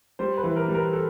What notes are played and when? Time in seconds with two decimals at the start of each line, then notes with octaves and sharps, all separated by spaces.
0.19 G3 C5
0.38 B4
0.44 E3
0.56 A#4
0.68 G3
0.75 A#4
0.93 A4